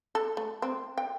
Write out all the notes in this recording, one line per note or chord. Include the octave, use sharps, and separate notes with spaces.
A4
A3
C4
G5